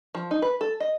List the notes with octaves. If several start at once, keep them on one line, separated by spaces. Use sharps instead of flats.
F3
D#4
B4
A4
D#5